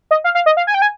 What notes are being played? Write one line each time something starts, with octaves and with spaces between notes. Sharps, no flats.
D#5
F5
F5
D#5
F5
G#5
G5
G#5